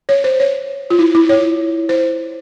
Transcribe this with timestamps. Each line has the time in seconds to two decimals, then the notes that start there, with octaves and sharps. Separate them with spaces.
0.09 C#5
0.24 C5
0.40 C#5
0.90 F4
0.99 E4
1.15 E4
1.29 C#5
1.89 C5